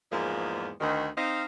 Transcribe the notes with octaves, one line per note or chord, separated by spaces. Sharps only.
E2 G#2 F3 G#3 A#3
D2 D#3
C4 D#4 D#5 F5